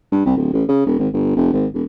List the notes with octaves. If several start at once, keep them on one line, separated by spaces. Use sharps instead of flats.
G2
C2
D1
A1
C#3
E1
G#1
G1
F1
G#1
E1